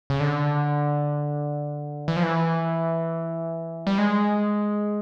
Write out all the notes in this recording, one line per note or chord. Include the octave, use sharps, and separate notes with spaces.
C#3
D3
E3
F3
E3
G3
G#3